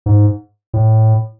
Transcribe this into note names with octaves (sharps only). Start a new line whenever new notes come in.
G#2
A2